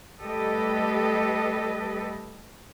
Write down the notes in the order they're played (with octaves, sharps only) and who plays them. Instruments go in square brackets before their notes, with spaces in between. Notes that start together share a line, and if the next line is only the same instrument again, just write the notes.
[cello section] G3 A3 G4 A4 B4 D#5